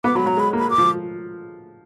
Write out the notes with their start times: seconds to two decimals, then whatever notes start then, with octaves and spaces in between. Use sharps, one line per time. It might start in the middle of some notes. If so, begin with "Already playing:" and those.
0.04 B3 D6
0.15 F#3 B5
0.26 F#3 A#5
0.37 G#3
0.40 B5
0.53 A#3
0.59 B5
0.70 D6
0.78 F3